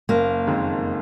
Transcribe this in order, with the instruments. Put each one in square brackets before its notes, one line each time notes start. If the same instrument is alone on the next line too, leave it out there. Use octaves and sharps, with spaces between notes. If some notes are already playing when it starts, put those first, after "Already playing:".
[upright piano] F#1 [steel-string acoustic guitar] A#3
[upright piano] F2 D#3 G#3